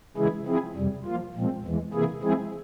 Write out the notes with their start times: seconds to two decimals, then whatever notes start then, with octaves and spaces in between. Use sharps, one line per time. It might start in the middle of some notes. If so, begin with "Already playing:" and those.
0.17 C#3 E3 G#3 E4 G#4
0.46 F3 C4 E4 G#4
0.76 F2 C3 G3
1.05 F3 A#3 F4
1.35 A#2 F3 G#3 C4
1.64 E2 E3 G#3
1.94 C3 E3 A#3 E4 G#4
2.22 F3 G#3 C4 E4 G#4